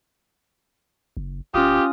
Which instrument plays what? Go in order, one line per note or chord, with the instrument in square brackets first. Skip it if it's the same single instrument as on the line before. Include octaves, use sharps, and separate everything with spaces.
[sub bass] F#1
[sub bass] D1 [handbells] C#4 D#6 [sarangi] F4 [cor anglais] G4